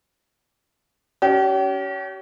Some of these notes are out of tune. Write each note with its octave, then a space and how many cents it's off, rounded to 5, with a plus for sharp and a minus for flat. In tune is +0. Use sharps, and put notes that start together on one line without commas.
C#4 +30 G4 -40